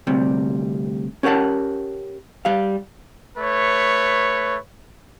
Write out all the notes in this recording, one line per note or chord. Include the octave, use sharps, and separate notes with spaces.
D2 C3 G3
C#4 G4 A#4 F#5 A5
G3 F5
A3 B4 C#5